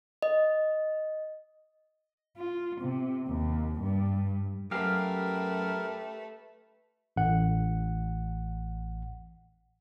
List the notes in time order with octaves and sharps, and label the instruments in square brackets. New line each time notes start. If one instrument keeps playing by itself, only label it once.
[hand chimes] D#5
[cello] F4
C3
D#2
G2
[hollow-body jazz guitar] F#2 [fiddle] A3 B4 [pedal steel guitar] G4 F5 [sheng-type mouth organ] A#4
[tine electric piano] A1 F#5